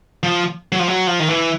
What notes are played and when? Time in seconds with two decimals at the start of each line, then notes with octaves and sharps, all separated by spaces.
0.23 F3
0.72 F#3
0.79 F3
0.88 F#3
1.07 F3
1.20 D#3
1.28 E3